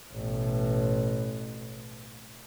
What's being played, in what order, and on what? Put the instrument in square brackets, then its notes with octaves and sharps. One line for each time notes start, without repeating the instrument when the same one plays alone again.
[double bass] A1 B2